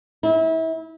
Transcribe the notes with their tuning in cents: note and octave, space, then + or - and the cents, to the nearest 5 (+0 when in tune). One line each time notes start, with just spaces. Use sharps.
E4 -30